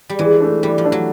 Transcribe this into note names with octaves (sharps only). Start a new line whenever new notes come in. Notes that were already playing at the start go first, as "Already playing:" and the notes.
G3
E3 G#3
A3 D4
E3 G3
F3
A3 D4
F#3